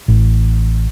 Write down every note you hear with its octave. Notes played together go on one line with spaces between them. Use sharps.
A1